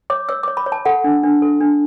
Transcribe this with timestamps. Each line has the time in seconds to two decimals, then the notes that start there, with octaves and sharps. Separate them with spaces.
0.10 C#5 D6
0.29 C#5 E6
0.43 C#5 D6
0.57 B5
0.66 C#5
0.72 A5
0.85 A4 F#5
1.04 D4
1.23 D4
1.42 A4
1.61 D4